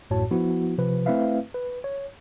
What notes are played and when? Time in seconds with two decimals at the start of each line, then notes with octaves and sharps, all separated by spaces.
0.10 A1 F#2 A2 F#4 C#5 A5
0.31 F3 B3 E4 F#4
0.78 C3 F3 B4
1.06 A3 C4 E4 B4 E5 F5
1.54 B4
1.84 C#5